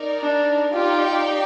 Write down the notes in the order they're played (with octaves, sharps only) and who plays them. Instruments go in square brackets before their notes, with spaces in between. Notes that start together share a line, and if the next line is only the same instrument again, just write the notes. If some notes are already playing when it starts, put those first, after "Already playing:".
Already playing: [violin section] D#4 A#4 D5
[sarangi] D4
[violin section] D#4 G4 D5 G5 [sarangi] F4